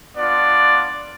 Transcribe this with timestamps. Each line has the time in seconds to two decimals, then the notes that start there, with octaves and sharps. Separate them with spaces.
0.17 B3 D4 F4 D5